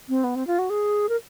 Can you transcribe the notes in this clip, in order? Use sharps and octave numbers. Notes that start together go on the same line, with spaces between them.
C4
B3
C4
F4
F#4
G#4
A#4